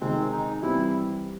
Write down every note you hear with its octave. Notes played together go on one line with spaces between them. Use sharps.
C3 D#3 G#3 C4
D#4
E3 G3 C4 E4